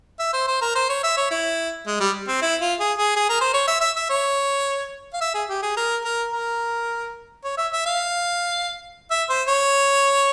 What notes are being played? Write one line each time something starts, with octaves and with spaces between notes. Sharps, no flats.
E5
C5
C5
A#4
C5
C#5
E5
C#5
E4
G#3
G3
C4
E4
F4
G#4
G#4
G#4
A#4
C5
C#5
E5
E5
E5
C#5
F5
E5
G#4
G4
G#4
A#4
A#4
A#4
C#5
E5
E5
F5
E5
C5
C#5